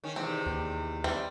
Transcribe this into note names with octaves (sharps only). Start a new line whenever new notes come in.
D#3 C#4
E2 C3 D#3 C4
D#2
E3 G3 C4